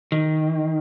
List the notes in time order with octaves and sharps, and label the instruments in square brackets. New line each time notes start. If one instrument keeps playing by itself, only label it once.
[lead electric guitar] D#3